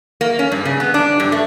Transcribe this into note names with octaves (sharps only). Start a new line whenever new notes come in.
A#3
C#4
G2
C#3
B3
D4
G2
A3